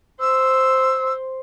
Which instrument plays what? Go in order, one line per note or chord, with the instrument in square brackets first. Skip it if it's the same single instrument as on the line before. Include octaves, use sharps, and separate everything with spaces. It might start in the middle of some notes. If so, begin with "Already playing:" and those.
[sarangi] C5 [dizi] E6